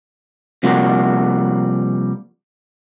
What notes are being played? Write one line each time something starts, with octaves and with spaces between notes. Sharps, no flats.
C3 F3 G3 A#3 F#4